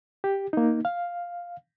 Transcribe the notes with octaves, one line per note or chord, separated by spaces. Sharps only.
G4
A#3 D#4
F5